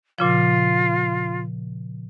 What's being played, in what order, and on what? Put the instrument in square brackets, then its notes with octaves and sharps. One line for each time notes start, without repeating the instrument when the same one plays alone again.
[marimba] A#2 C#3 F3 [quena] F4